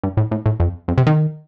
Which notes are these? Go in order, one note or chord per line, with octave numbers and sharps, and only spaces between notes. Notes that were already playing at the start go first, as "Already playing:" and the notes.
G2
A2
A2
A2
F2
F2
C3
D#3